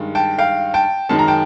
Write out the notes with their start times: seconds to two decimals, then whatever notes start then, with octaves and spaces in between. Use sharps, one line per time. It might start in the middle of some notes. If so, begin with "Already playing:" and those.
Already playing: G2 D#3 G#3
0.15 G5 A5
0.38 F5 G5
0.74 G5 A5
1.09 F#2 D#3 G#3 A5
1.19 A#5
1.28 G5 A5